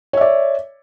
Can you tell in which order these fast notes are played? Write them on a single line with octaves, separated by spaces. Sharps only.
C#5 E5 D5